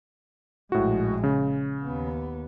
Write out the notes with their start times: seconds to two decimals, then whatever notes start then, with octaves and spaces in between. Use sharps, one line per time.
0.72 A#1 A2 G#3 F#4
1.24 C#3
1.84 D#2 B3